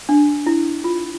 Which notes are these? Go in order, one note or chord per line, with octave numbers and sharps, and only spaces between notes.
D4
E4
F4